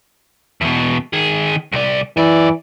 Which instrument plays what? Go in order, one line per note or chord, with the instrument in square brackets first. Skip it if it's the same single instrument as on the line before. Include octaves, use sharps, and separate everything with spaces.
[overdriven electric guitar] E2 B2
D#3 G#4
C2 D5
[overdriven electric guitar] F#2 D5 [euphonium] E3